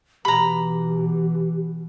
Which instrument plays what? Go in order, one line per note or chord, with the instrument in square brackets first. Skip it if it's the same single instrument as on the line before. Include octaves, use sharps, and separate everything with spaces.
[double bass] B2 E3 [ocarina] G4 [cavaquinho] A#5 B5